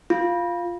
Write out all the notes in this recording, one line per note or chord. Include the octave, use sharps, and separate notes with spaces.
F4